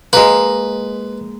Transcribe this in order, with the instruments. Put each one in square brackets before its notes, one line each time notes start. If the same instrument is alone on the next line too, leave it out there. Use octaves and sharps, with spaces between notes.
[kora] G#3 A#3 [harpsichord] B4